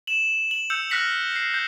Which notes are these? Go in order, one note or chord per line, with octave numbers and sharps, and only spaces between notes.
E7 F#7
F#7
E6 G6 C#7 F7
F6 F#6 A#6 B6 C#7 F#7
F6 C7
G6